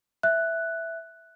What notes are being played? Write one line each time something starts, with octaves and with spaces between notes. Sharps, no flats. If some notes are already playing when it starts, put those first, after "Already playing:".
E5 F#6